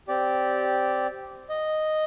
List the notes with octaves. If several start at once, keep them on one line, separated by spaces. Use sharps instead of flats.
C4 G4 D5
D#5